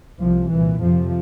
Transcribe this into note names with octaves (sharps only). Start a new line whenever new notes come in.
C2 C3 F3
C2 A#2 E3
F2 C3 F3